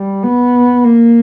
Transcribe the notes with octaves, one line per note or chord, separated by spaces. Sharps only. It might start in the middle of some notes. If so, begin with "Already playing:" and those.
Already playing: G3
B3
A#3